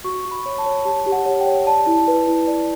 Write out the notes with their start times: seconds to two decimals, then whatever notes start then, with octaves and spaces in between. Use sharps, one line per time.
0.04 F#4 C#6
0.25 F#4
0.31 B5
0.46 C#5
0.58 A5
0.66 C#5
0.85 G4 A5
1.06 G4
1.12 F#5
1.26 C#5
1.40 G5
1.46 C#5
1.67 D5 A5
1.86 E4
2.08 B4
2.27 E4
2.47 D5